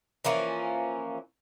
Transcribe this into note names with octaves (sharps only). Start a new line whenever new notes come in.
E3 F3 A#3 C#4